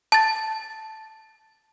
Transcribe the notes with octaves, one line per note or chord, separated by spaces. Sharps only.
A5 A6